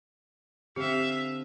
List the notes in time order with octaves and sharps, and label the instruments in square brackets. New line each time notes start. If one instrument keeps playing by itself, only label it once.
[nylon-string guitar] D3 C4 [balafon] G4 [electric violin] E5 F5